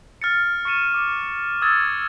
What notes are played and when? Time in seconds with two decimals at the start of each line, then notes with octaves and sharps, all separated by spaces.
0.22 F6 A6 C#7
0.65 C#6 A6 C#7 D#7 E7
0.94 D6 E7
1.62 D#6 E6 G#6 A6